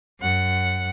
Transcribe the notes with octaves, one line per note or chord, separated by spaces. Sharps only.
F#2 F#5